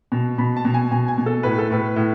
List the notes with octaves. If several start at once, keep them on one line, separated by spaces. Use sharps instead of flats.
B2
B2 B5
A5
B2
G#5
B2 G#5
G#5
B2
A4
A2 B4
A4
A2 B4
A2